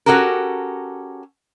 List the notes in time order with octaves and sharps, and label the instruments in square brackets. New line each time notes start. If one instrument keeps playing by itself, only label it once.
[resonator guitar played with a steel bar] C#4 F#4 G4 A4 A#4